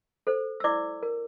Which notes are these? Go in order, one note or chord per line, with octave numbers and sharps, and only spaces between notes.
A4 C5
E6
E4 D5 D6
A#4